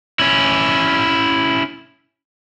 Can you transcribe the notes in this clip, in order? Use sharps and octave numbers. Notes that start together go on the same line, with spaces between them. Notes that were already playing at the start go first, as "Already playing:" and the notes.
C#4 E4